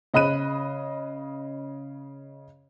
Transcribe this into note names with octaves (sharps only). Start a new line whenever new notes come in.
C#3 D#5 B5 F#6 D#7